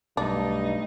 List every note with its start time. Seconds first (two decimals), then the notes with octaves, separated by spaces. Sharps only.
0.17 B1 G2 A3 D4 D#4